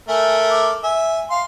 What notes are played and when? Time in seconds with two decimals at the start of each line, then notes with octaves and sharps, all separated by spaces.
0.09 A3 A#4 E5 G#5
0.50 D6
0.83 E5 G#5
1.30 F5 C6